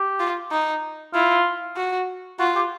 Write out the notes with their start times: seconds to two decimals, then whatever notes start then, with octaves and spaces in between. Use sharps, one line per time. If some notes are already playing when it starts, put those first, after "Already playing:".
Already playing: G4
0.20 F4
0.52 D#4
1.14 E4 F4
1.76 F#4
2.39 F4 F#4
2.56 G4